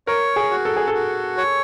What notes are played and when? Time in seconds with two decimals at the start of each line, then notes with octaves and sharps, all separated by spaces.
0.07 A#4 C#5
0.36 G#4
0.51 F#4
0.65 A4
0.76 G#4
0.88 A4
0.94 F#4
1.37 C#5